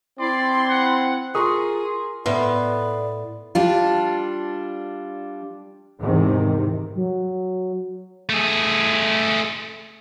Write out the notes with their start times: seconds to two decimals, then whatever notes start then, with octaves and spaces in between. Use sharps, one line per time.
0.19 C4 E4 D5 C6
0.70 F#5
1.35 F4 G#4 A#4 A#5 C6 C#6 D#6
2.26 A2 B3 B4 D5 E5 C6
3.55 G3 D4 F4
6.01 E2 G#2 C3 D#3
6.96 F#3
8.29 A3 G#4